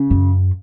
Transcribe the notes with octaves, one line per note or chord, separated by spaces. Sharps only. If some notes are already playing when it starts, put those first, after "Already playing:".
Already playing: C#3
F#2